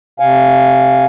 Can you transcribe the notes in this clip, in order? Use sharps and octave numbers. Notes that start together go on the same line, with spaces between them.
C3 F5 G#5